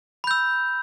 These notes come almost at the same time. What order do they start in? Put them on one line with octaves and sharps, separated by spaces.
B5 G6 E6